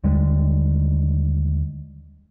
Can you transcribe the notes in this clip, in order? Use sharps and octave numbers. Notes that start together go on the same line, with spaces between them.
D#2 D3 G3 G#3